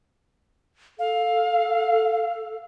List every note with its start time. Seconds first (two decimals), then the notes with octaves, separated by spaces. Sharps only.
0.99 A4 F5